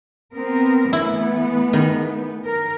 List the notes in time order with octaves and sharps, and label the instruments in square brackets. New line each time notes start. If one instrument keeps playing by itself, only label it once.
[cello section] B3 C4 A#4
[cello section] E3 A3 B3 [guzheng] E4
[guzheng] D#3
[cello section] A#4